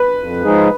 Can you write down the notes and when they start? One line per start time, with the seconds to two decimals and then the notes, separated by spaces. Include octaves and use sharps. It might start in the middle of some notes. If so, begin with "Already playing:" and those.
Already playing: B4
0.16 F2
0.42 F3 G#3 D#4 G#4